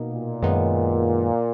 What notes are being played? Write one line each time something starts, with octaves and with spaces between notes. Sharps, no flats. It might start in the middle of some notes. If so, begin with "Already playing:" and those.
Already playing: B2 A#3 D#4
A#2
F#2 D#3 G#3 B3 D#4